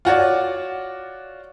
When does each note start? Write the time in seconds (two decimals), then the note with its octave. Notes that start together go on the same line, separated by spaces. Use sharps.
0.05 F4 F#4 C#5 D5